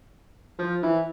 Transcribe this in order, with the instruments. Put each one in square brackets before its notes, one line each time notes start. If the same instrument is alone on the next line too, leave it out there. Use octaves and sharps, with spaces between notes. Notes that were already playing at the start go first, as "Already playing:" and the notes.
[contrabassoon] F3
E3